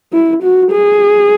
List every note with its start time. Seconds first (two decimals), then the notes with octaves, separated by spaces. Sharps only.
0.13 E4
0.43 F#4
0.72 G#4